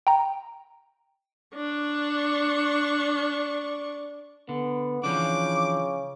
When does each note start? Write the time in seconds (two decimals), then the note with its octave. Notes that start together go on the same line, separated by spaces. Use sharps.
0.07 G5 A#5
1.55 D4 C#6
4.49 D3 B3
5.04 C#3 E3 F3 D4 D6